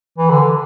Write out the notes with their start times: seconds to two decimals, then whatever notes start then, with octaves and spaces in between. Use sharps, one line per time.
0.18 E3
0.30 D3